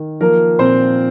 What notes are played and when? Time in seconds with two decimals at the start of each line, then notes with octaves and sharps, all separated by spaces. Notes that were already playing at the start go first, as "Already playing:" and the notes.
Already playing: D#3
0.21 F3 A#3 A#4
0.59 A#2 C4 C5